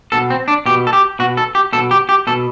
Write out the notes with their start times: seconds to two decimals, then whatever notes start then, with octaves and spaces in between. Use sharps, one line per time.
0.12 B2 A4
0.30 C4
0.48 D4
0.66 B2 G4
0.87 A4
0.93 G4
1.19 B2 F#4
1.37 A4
1.55 G4
1.73 B2 A4
1.91 G4
2.09 G4
2.27 B2 A4